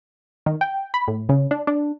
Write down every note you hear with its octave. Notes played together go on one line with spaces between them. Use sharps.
D#3
G5
B5
A2
C#3
D4
D4